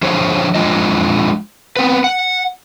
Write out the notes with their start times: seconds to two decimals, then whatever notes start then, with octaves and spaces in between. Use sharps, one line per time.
0.02 F3 D4 G#4 C5 C#5
0.55 F3 G#3 D4 F4 D#5
1.76 B3 C4 B4
2.04 F#5